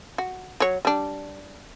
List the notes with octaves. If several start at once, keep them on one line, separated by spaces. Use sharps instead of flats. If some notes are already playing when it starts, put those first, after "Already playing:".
F#4
F#3 C#5
G3 D4